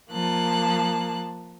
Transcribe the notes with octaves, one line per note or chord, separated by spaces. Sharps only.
F3 A#3 A5 F#6